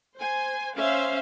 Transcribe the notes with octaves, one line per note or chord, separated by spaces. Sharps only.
C5 G#5
C#4 C5 E5 F5